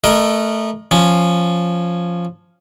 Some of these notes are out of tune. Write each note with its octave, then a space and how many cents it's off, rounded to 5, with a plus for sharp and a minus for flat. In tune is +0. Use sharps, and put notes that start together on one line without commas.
A3 +0 A#4 +15 D#5 -30
F3 +0 C#4 +0